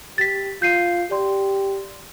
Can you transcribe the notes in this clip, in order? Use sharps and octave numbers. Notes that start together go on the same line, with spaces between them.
G4 A6 B6
F4 G6 C7 D#7
G4 D5 C6